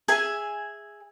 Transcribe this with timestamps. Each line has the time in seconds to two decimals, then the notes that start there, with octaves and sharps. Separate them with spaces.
0.08 G#4 E5 G#5